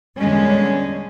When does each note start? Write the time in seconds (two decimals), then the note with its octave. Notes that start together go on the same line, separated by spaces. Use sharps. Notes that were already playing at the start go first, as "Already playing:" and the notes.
0.18 E2 A#2 D3 G3 G#3 C#4